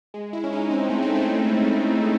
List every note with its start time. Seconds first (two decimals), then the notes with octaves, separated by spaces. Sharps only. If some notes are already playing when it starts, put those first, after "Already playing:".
0.14 G#3
0.33 E4
0.44 C#4
0.53 D#4
0.71 C4
0.90 A3
1.02 C4
1.16 A3